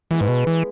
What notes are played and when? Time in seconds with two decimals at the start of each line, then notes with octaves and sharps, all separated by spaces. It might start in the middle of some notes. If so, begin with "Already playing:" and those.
0.11 E3 G#3 B3 E4
0.21 G#2
0.28 B2
0.47 E3